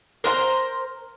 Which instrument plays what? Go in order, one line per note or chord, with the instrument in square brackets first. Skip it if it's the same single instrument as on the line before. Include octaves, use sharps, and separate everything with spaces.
[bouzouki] A#4 C5 F5 A#5